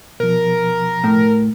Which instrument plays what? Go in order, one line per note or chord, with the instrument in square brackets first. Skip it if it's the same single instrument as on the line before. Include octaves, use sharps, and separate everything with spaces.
[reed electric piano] B2 F3 [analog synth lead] A#4
[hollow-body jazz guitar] A2